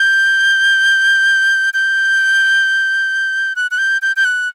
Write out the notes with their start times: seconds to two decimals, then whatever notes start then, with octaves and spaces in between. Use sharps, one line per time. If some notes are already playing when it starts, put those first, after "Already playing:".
Already playing: G6
1.74 G6
3.56 F#6
3.71 F#6
3.78 G6
4.02 G6
4.16 G6
4.25 F#6